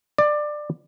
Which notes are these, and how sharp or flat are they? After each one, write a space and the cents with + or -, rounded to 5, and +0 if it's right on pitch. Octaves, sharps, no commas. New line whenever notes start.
D5 +20